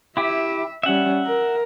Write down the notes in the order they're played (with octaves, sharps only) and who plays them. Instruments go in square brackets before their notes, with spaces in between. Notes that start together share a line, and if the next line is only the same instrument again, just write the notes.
[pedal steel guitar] E4 G4 [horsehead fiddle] E5
[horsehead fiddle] G3 C#4 [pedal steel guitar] E5 F#5
[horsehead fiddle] A#4